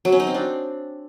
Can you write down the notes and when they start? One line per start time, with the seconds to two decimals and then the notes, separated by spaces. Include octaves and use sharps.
0.05 F#3
0.12 C#4
0.20 D#4
0.27 C4
0.34 D4